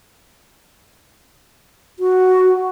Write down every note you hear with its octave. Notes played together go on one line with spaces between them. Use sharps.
F#4